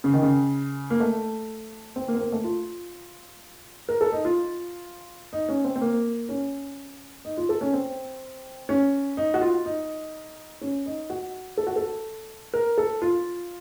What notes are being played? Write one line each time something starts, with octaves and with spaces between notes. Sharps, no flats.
C#3
D#3
C#3
A#3
A3
C4
A#3
C4
A#3
A3
F4
A#4
A4
D#4
F4
D#4
C#4
C4
C4
A#3
C#4
D#4
F4
A4
C#4
C4
C#4
D#4
F#4
F4
D#4
C#4
D#4
F#4
A4
F#4
A4
A#4
A4
F4